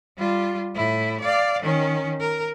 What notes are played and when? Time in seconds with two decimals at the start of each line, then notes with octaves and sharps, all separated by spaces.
0.18 G3 F4
0.75 A2 E4
1.21 D5 F5
1.62 D#3 C#4
2.20 A#4